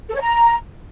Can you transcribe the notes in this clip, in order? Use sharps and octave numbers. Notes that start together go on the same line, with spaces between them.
A4
C#5
A#5